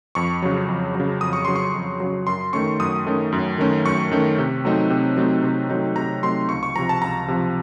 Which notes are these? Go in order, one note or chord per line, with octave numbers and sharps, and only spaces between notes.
F2 C#6
C#3 F#3
F2
C#3 F#3
F2 D#6
C#6
C#3 F#3 C6
C#6
F2
C#3 F#3
F#2 C6
D#3 A3 C#4 C#6
F#2 D#6
D#3 A3 C#4
F#2
D#3 A3 C#4
F#2 C#6
D#3 A3 C#4
C3
F#3 A3 C4 D#4
C3
F#3 A3 C4 D#4
C3
F#3 A3 C4 D#4
C3 A#5
F#3 A3 C4 D#4 C6
C#2 C#6
C#6
C3 F3 A#5
A5
C#2 A#5
C3 F3